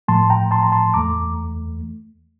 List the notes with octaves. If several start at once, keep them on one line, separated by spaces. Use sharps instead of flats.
A2 F3 A3 A5 C6
G5 A#5
A5 C6
A#5
A5 C6
E2 E3 A3 A#5 D6